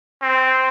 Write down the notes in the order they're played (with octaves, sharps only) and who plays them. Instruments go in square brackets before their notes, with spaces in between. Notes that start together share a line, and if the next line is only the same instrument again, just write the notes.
[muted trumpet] C4